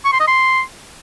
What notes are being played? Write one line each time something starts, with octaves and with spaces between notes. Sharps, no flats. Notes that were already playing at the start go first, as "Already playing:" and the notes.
C#6
C6
D#5
C6